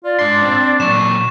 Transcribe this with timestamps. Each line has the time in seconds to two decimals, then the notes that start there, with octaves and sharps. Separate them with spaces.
0.04 F4 D5
0.19 G#2 D4 C6
0.42 C4
0.80 A#2 F#3 C#6 E7